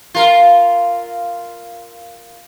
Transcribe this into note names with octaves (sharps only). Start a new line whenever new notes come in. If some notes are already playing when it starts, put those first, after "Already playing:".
F4 A#4